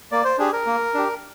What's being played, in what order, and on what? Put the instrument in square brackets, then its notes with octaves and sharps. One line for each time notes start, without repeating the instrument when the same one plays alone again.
[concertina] A#3 D5
C5
D4 G4 G#4
A#4
A#3
D4 G4